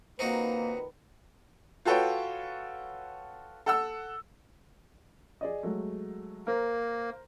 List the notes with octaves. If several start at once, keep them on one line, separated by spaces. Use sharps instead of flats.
A#2 D#3 A#3 C4 D#4 F#4 B4
F4 F#4 A4 B4 C#5 G5
A4 F#5 E6
G#4 D5 D#5
F#3 G#3 A3
A#3 A#4 C5